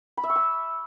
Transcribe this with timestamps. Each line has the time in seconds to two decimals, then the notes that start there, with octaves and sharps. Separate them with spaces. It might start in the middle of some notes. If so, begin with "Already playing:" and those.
0.17 B5
0.23 E5
0.30 C#6
0.36 E6